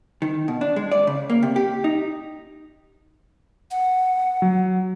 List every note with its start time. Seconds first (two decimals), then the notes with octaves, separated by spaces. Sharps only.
0.22 D#3
0.48 B2
0.61 D4
0.76 G#3
0.91 D5
1.07 C#3
1.30 A#3
1.43 C3
1.56 G4
1.84 D#4
3.71 F#5
4.42 F#3